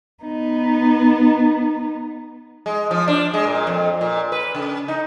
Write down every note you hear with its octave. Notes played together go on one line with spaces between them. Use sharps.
B3 D#4
G#3
F3
D4
G#3
A#2
F2
A#2
B4
C#3
D#4